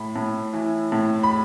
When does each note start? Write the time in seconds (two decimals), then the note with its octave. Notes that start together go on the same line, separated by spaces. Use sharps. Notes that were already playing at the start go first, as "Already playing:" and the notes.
Already playing: A2 B5
0.16 A2
0.53 E3
0.92 A2
1.23 B5